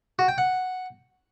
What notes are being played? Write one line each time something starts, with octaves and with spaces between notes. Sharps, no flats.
F#4
G5
F#5